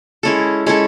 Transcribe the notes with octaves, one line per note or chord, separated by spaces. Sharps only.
G#3 C#4 E4 A4
G#3 C#4 E4 A4